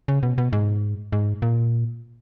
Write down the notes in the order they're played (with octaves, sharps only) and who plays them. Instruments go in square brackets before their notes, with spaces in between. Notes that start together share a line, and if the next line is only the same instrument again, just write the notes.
[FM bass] C#3
B2
B2
G#2
G#2
A#2